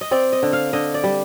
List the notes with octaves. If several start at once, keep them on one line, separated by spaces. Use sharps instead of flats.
D#5
C4 D5
D#5
D3
F5
D3 D#5
D5
G3